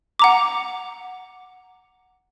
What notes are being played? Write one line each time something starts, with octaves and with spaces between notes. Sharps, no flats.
F#5 A#5 D6